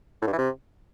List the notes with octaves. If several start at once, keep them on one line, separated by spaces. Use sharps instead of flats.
A2
G2
E3
C3